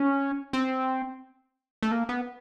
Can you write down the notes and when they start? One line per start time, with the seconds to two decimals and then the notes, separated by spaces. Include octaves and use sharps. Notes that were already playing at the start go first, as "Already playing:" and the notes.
Already playing: C#4
0.53 C4
1.83 A3
1.91 A#3
2.09 B3